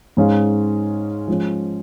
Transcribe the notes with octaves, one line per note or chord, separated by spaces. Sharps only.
G#2 G#3 C#4 G#4 F5
F3 G#3 C#4